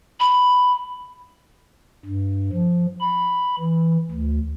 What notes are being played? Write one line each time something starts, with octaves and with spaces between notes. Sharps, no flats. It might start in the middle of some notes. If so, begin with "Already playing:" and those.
B5
G2
F3
B5
E3
D2